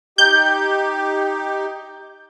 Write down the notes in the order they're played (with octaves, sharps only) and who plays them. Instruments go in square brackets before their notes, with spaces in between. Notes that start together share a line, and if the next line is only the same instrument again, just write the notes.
[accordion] D#4 G4 [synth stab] G6